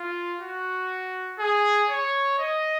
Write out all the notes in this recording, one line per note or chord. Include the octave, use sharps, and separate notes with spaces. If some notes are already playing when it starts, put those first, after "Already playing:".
Already playing: F4
F#4
G#4
C#5
D#5